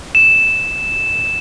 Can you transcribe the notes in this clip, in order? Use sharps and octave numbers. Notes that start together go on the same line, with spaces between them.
E7